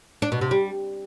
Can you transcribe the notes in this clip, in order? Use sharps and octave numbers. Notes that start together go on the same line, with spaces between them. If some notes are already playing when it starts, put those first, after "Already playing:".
D4
B2
C3
G3